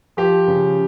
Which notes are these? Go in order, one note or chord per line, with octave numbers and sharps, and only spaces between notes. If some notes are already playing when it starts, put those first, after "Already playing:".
F3 G4
C#3